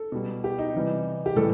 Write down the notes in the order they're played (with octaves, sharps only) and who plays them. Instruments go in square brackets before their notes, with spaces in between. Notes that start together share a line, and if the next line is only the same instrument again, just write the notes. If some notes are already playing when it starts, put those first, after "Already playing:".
Already playing: [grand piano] A4
B2 G3
G4
D#4
C3 E3 G3
G4
A2 E3 G3 A4